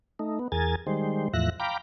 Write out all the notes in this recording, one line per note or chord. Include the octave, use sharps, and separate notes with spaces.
A3 D#4
B3
E2 G#4 A#4 G#5 A6
D#3 G3 G#3 C5
E2 A2 F3 E5 F#6 A#6
F5 G5 A#5 B5 D6